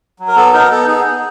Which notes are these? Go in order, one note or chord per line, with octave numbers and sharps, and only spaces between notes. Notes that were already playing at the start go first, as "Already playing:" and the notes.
F#3
A#4
B3 A4
D#4 A#4
B3 A4
D#4 G#4
B3